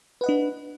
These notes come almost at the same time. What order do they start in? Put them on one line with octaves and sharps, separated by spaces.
B4 F#5 D#5 D4